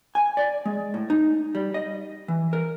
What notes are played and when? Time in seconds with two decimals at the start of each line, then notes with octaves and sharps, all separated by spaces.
0.15 G#5
0.37 D5
0.66 G#3
0.94 A2
1.10 D#4
1.55 G3
1.74 D#5
2.28 E3
2.53 A#4